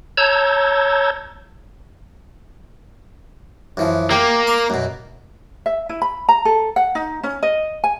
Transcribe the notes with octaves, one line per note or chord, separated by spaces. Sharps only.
C#5 A5 A#5 E6 G6 G#6
F#2 E3 F3
A#3 G4
C6 D6
F#2 B2
E5
E4
B5
A#5
A4
F#5
D#4
C#4
D#5
G#5